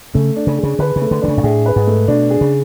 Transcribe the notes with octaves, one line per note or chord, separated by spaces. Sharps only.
C#3 A3
D4
C#3
G#4
C#3
D3 B4
C#3
A3
D3
D3 D4
C#3
G#2
A2 G#4
B4
G#2
A3
B2 D4
G#4
C#3